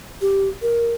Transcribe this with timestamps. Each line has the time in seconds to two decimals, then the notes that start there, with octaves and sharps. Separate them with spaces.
0.21 G4
0.62 A#4